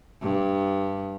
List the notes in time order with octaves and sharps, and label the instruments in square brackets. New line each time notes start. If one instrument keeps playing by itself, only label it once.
[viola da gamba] G2